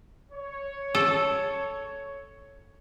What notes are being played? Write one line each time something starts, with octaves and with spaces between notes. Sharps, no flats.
C#5
A4